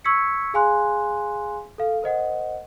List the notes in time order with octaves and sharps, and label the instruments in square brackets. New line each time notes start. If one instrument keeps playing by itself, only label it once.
[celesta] C#6 E6 G#6 B6 C#7
G#4 F5 G#5 C6 F#6
A4 F5
A#4 C5 D#5 F#5